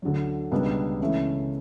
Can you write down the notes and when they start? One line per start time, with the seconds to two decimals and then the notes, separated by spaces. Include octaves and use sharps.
0.02 D2 D3 F#3
0.51 C#2 B2 G3 B3 D4
1.00 C#2 C#3 E3 A3